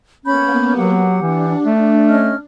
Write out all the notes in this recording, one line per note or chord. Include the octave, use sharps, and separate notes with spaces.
A#3 B3 C#4 B5 G6
F#3 G4 F#5
E3 D4
A3
C#4 D#5 F6